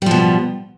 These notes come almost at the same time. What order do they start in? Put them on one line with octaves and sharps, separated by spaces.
G3 F3 B2